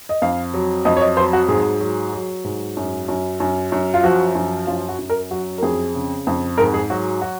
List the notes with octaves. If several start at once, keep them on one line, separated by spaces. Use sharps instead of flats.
D#5
F2 F5
F#3
F2 D#5
C#5
D#5
F#3 C5
F#4
G#2 G#4
F#3
F#3
G#2
F#2
F#2
F#2
F#2
F4
F3 F#4
F#2
F#2 F4
F#4
F#2
A#4
F#3 F#4
A#4
F2 G#4
C#3
F2
G#2 A#4
G#4
F#3 F#4
F#4